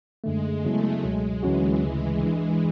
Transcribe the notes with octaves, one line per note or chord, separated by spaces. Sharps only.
F#2 D3 G#3 A3
C#3 F#3 A3 B3 E4 G#4
C#2 B2 F#3 G#3
D2 D3 E3 F#3 C#4 F#4
D2 C#3 G#3
E3 G#3 D4